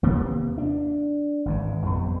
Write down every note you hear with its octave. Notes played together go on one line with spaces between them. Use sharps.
D#2 C3 A#3 B3
D4
G#1 G#2 E3
F2 G3 B3